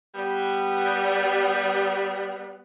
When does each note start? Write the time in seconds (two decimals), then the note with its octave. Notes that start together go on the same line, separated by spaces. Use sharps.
0.15 G3 B3